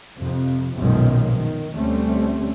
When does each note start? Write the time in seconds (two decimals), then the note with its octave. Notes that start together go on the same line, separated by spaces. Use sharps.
0.18 F2 C3
0.77 B1 F#2 A#2 D#3 F3 G#3
1.34 D#3
1.76 D2 G3 A3 C4 C#4